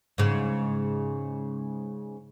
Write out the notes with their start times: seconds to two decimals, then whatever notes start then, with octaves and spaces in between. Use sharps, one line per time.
0.18 G#2 C#3